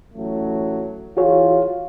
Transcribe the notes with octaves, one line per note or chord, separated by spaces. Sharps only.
A1 F#3 A3
E3 F4 F#4 G#4 C#5